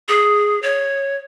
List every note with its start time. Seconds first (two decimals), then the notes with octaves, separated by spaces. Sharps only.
0.08 G#4
0.62 C#5